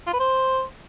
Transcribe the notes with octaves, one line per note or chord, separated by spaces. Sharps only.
F4
B4
C5